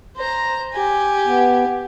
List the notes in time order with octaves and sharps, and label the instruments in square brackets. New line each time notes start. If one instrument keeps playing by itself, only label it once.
[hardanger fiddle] C5 A#5
G4 G#5
[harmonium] B3